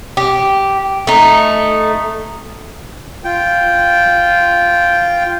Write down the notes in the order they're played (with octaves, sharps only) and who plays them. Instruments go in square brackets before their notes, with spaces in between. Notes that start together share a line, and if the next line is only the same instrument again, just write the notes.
[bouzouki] G4
A3 D#4
[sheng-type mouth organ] F4 G5